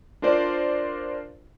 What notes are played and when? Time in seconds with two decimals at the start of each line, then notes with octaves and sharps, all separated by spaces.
0.22 D4 F4 A#4 C5 D5